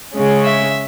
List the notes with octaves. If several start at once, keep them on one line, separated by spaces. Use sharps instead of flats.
C#3 G#3 C#4
E5